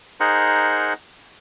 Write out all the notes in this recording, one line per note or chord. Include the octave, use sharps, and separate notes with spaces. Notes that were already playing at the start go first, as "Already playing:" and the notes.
D#4 G#4 A#4 C5 F#5